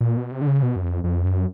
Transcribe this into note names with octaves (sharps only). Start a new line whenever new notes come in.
A#2
B2
C3
D3
C#3
B2
F#2
F2
F2
F#2